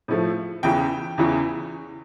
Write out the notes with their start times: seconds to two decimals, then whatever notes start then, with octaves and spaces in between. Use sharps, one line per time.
0.08 A2 F3 A3
0.63 E2 C#3 E3 G5
1.18 E2 C#3 E3